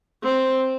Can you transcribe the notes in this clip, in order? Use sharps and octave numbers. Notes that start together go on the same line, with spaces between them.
C4